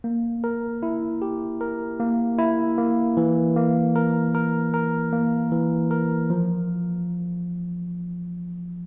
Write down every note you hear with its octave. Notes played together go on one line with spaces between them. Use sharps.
A#3
A#4
E4
G4
A#4
A#3
E4
A#3
E3
A#3
A#4
A#4
A#4
A#3
E3
A#4
F3